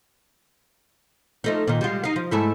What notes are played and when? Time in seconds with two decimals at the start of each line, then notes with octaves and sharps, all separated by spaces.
1.44 F3 A3 D#4
1.67 A#2 D#3
1.81 G3 G#3 F4
2.04 D#4 F5
2.16 F3
2.31 G#2 A3 E4